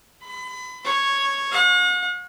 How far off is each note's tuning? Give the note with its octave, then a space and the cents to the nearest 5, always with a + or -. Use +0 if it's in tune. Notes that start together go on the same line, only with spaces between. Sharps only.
B5 +35
C#5 -5
F#5 -45